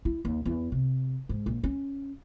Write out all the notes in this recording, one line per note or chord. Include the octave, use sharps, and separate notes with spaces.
E4
D#2
E2
C3
G#2
A#1
C#4